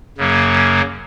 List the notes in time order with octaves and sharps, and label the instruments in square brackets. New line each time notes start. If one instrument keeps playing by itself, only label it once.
[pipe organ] F#2 C#3 F#3 A#3